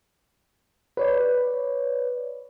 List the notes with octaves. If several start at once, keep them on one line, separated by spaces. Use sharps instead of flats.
B4 C#5 D5